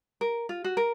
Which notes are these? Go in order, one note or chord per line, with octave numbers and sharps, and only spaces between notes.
A#4
F4
F#4
A#4